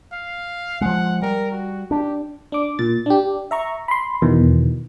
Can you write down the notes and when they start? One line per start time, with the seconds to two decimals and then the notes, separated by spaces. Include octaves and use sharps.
0.12 F5
0.81 F3 G#3 F#5
1.22 G3 A#4
1.52 F#4
1.91 D4 G4
2.52 D4 D6
2.79 A#2 A6
3.06 D4 G4
3.51 E5 A#5 C#6
3.88 B5 C6
4.22 E2 B2 D#3 E3